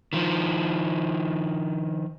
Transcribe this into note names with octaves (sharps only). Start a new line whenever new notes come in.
D#3 F3